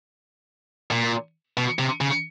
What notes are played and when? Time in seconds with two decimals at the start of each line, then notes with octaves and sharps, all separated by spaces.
0.91 A#2
1.57 B2
1.79 C3
2.01 C#3